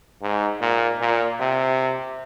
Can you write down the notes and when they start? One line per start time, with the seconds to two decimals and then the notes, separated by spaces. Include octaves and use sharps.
0.22 G#2
0.61 A#2
1.00 A#2
1.40 C3